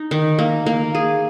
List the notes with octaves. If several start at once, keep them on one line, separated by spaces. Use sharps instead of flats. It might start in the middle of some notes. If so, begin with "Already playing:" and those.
Already playing: D#4
D#3
A#3
A#3
G#4